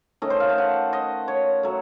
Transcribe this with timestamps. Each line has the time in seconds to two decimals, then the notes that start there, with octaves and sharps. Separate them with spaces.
0.22 D#3 A3 C#4 D#5
0.30 C5
0.40 F5
0.49 A5
0.58 F#5
0.93 D#5
1.28 C#5
1.63 F#3 A3